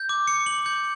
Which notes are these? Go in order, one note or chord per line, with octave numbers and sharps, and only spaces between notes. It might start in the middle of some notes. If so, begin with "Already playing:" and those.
Already playing: G6
D6
C#7
F#7
G6